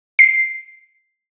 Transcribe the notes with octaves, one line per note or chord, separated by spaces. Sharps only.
C7